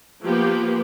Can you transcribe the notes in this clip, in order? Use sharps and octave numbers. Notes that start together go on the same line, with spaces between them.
F3 A#3 B3 G4